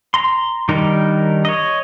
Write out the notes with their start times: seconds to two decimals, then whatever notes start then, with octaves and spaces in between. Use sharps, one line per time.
0.14 A#5 C6
0.69 D#3 G3 D4 D#4 A#4
1.45 C#5 D#5